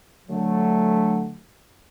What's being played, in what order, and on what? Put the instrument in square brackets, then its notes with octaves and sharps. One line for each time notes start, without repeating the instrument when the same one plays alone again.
[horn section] D3 F#3 A3